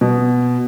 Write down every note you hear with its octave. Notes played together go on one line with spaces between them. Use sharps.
B2